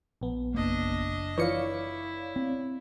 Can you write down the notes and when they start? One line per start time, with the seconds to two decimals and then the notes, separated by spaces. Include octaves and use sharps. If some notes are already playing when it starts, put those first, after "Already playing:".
0.21 A#1 B3
0.55 F#1 A#3 D4 D#5
1.38 E3 F3 E4 C#5 D5 F5 C#7
2.36 C4